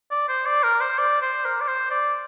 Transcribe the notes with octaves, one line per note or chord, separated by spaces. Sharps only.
D5
C5
D5
A#4
C5
D5
C5
A#4
D5
C5
D5